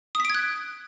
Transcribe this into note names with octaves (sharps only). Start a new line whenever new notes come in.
D#6 F#6 G#6 B6 D7